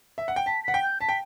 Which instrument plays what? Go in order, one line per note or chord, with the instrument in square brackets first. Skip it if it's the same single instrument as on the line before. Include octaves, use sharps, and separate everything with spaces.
[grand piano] E5
F#5
G5
[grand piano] A5 [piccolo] B6
[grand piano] F#5 [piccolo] B6
[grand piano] G5
[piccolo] G6
[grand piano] A5 [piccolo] B6
[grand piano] G5